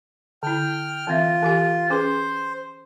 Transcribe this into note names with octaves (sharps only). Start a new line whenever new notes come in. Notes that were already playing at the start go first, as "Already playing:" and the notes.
D3 E4 G5 F6
E3 C4 F4 E5
E3 G4 G#5
C#4 G#4 B4 C5